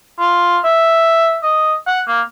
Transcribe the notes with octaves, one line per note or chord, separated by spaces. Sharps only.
F4
E5
D#5
F#5
A#3